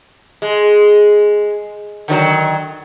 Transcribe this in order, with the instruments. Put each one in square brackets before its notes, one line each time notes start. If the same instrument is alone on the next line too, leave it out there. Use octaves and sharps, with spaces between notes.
[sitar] G#3
D3 D#3 F#3